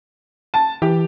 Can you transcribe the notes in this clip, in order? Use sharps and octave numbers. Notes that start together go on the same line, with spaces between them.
A5
E3 G4